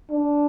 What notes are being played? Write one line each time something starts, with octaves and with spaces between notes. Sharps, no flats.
D4